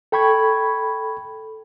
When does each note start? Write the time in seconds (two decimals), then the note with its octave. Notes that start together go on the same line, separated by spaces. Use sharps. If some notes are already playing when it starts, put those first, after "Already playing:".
0.12 A4 G5 B5 C#6 G#6